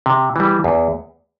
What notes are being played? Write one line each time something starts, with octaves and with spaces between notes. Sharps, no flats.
C3
E3 G3
E2